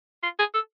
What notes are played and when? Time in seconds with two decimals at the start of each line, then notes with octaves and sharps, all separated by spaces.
0.23 F4
0.39 G#4
0.54 A4